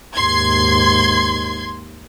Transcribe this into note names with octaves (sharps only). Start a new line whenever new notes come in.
D#2 G#2 C6 G#6